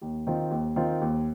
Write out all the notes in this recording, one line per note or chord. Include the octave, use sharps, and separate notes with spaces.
D#2
D#3 C4 F4
D#2
D#3 C4 F4
D#2